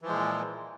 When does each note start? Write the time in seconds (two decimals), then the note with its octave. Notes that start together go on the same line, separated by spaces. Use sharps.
0.02 E3
0.05 F3
0.08 G#3
0.11 A#2